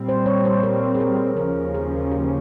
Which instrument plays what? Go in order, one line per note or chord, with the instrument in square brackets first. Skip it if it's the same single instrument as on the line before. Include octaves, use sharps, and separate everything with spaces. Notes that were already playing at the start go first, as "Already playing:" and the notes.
Already playing: [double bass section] A#2 G3 C4
[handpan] C5
C#5
C5
A#4
G#4
A#4
[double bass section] D#2 C#3 F3 A#3 C#4 [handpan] A#4
[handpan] G#4
G4